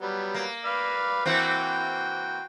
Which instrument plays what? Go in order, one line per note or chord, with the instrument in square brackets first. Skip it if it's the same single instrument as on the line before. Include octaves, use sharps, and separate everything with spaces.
[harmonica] F#3 G3 B3
[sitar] A#3
[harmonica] B4 D5 F5
[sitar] E3 A#3 C4 [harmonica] F#4 G5